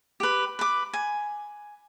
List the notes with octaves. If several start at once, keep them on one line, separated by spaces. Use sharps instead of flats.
G4 B4
B4 D6
G#5